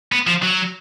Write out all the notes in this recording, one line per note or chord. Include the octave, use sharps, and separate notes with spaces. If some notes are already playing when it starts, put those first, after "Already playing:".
B3
F3
F#3